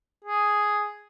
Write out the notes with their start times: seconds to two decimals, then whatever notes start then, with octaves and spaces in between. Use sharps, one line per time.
0.25 G#4